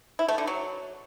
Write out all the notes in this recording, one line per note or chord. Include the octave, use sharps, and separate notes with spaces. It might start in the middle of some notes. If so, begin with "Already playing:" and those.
E4
A3
D3
F#3